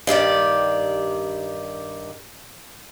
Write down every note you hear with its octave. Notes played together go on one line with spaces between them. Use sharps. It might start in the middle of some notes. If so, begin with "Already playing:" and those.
G2 D#3 G4 D5